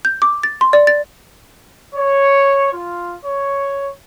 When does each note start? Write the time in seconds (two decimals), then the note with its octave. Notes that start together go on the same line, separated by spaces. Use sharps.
0.05 G6
0.22 D6
0.43 A6
0.61 C6
0.73 D5
0.87 A6
1.95 C#5
2.73 F4
3.25 C#5